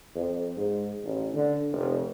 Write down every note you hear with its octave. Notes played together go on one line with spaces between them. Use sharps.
F2
G#2
A1
D3
F1